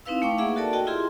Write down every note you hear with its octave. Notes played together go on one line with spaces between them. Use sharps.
C4 D#4 E4 B4 F5 E6
A3 F5 G5 C#6 D6
A#3 D#4 G#4 E5 F#5
F#4 A4 A#4 D5 A5
F#4 D#5 G5
E4 F4 G4 G#4 E5 C6